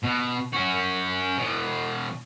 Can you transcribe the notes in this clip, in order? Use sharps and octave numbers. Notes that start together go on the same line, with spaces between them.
B2
C#4 F#4
B2 E3